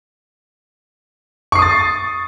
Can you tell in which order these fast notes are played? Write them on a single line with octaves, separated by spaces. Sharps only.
C#6 C7 D#6 A6